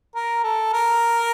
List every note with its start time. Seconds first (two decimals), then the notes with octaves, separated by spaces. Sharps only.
0.15 A#4
0.44 A4
0.73 A#4